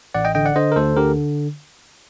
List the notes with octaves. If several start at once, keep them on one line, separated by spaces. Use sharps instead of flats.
A1 D5 F#5
D#5 G5
D3 D#5 G5
D5 F#5
D3 C5 D#5
A#4
D2 A4 C5
D3 G4 A#4